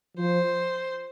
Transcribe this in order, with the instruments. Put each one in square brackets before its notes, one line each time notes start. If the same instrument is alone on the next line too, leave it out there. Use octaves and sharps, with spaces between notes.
[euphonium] F3 [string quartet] C5